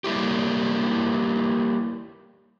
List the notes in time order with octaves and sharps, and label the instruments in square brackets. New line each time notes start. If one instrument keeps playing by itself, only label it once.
[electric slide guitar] G3 A#3 E4 G4